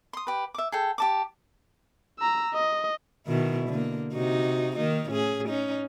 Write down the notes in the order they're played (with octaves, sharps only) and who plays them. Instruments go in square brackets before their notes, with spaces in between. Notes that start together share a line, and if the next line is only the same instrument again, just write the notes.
[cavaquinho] C6 D#6
G4 B4
E5 D6
G#4 A4 G5
G4 A5 D6
[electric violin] A#5 E6
D#5
[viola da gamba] B2 D#3 E4
D3 A#3
C3 D#4 F#4
D#3 A#3 D#4
A2 C#4 G#4
C#4 D#4